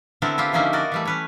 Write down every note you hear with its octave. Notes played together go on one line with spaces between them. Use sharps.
D3 B3 C4 E4 A4 A#4
E4 F4 G4
D3 F3 A#3 C#4 D#4 E4
F#4 A#4 D5 D#5
E3 G3 A3
C#4 B4 C#5